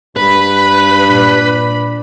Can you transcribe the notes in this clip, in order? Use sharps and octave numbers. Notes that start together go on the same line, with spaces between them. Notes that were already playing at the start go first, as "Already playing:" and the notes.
G2 B4 B5
A#2 D4